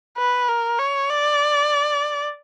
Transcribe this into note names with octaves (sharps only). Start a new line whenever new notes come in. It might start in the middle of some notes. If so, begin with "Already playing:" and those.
B4
A#4
C#5
D5